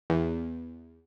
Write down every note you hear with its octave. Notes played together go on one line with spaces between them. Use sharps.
E2